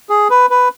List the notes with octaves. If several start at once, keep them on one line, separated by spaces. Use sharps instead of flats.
G#4
B4
B4